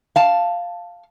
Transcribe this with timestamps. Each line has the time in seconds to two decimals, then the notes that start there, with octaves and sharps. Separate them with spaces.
0.16 F5 A5